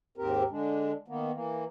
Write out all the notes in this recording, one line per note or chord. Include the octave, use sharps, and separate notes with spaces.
D#2 G#2 C4 G4 A#4
D3 G#3 D4
D#3 A#3 B3
E3 A#3